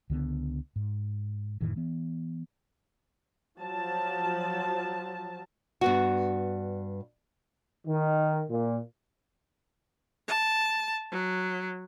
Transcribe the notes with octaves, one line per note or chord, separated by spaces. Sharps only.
C#2 D3 F#3 B3
G#2
F2 A2 D#3 E3
E3 B3
F3 F#3 A5
G2 B3 F#4
D#3
A#2
A5
F#3